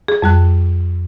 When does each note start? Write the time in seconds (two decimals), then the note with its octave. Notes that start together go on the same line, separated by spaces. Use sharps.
0.08 G#4
0.22 F2 G3 F#6